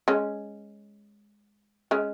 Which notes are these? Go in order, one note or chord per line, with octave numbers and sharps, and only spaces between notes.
G#3 C#4
G#3 C#4